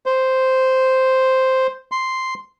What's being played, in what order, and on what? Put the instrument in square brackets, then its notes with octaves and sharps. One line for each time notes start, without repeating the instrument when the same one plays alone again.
[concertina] C5
C6